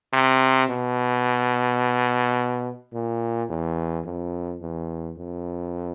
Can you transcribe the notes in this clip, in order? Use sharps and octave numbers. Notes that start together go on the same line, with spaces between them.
C3
B2
A#2
E2
F2
E2
F2